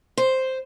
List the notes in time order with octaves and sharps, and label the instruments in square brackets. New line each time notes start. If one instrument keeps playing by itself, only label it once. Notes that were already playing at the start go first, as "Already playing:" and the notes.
[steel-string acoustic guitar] C5